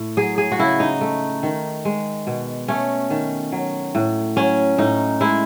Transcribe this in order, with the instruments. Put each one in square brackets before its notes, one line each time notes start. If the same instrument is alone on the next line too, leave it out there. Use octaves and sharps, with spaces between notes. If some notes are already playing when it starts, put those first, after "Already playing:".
Already playing: [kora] A2
F#3 G#4
G#4
F#4
C#3 E4
D#4
A3
D#3
G#3
B2
A3 C#4
D#3
F#3
A2
F#3 C#4
A2 D#4
G#3 E4